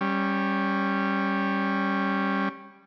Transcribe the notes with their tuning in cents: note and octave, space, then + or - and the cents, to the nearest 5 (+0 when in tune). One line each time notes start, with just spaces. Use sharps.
G3 +5 C#4 -15